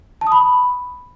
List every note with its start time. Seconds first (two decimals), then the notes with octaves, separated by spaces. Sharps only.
0.21 A5
0.27 D#6
0.32 B5